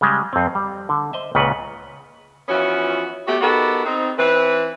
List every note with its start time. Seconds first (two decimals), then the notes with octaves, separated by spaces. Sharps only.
0.01 C#3 G3 G#3
0.33 F2 C4
0.55 G3
0.89 D3
1.13 C5 D#5 E5
1.35 C#2 A#2 C#3 B4 F#5
2.49 E3 F3 B3 C#4 F4 F#4
3.27 A3 B3 F#4 G4
3.41 B3 D#4 F#4 G4 A4 A#4
3.85 C4 D#4
4.18 E3 C4 B4